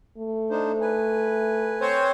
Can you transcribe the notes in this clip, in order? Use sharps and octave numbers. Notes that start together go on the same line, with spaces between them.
A3
D4 D#4 C5
B4 G#5
C4 C5 C#5